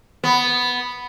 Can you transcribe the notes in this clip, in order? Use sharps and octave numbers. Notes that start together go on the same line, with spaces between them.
B3